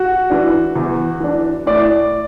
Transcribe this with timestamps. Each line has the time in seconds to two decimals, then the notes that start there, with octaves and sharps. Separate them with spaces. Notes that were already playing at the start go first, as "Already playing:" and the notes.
Already playing: F#4
0.30 E3 D4
0.76 E2
1.20 E3 D4
1.67 A2 D5